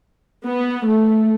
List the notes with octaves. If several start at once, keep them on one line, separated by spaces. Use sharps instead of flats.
B3
A3